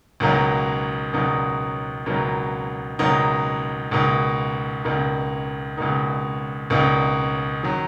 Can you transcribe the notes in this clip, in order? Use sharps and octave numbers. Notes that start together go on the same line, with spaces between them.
C#2 B2 F#3 A#3 D#4
C#2 B2 F#3 A#3 D#4
C#2 B2 F#3 A#3 D#4
C#2 B2 F#3 A#3 D#4
C#2 B2 A#3 D#4
C#2 B2 A#3 D#4
C#2 B2 A#3 D#4
C#2 B2 A#3 D#4
D#3 F#3